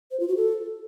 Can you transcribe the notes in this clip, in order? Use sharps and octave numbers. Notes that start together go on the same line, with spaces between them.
C5
F4
F#4
A4